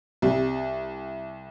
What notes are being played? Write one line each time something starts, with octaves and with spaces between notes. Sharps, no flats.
C2